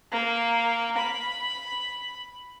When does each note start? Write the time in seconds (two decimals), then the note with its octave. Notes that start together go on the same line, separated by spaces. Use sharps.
0.11 A#3
0.98 B5